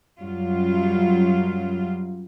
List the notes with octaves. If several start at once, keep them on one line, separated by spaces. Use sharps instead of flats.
F#2 F#3 G3 F4